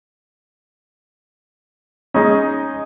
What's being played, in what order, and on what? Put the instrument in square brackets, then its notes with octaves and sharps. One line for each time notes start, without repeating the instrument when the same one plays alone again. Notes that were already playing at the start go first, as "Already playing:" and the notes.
[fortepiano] G#3 C#4 [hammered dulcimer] D#4